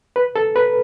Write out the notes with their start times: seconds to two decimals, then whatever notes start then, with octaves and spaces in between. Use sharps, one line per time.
0.16 B4
0.36 A4
0.56 B4